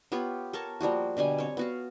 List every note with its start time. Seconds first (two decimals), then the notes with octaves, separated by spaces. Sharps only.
0.12 B3 F4 G4 C#5
0.53 A4 A#4 C#5 A5
0.81 F3 G3 A#3 F#4
1.17 B2 D3 G3 G#5
1.38 C4 C#5
1.57 B3 F#4 F5